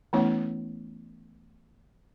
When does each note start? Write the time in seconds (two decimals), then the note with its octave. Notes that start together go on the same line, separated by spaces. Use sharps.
0.13 E3 A3 B3 C#4 E4 C#5